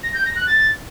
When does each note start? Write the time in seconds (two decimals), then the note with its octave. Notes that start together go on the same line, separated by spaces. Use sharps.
0.03 A#6
0.14 G6
0.25 A#6
0.36 F#6
0.47 A6